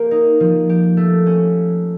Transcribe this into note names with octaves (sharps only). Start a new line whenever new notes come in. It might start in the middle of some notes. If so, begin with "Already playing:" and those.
Already playing: A#3 G4
D#4
F3
G4
A3
C#4